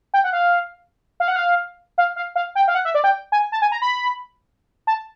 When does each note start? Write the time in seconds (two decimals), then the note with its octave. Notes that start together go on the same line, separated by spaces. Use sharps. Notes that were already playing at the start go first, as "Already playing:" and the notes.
0.14 G5
0.24 F#5
0.33 F5
1.20 F5
1.28 F#5
1.36 F5
1.98 F5
2.16 F5
2.36 F5
2.55 G5
2.68 F5
2.75 F#5
2.85 E5
2.95 D5
3.04 G5
3.32 G#5
3.52 A5
3.62 G#5
3.72 A#5
3.82 B5
4.87 A5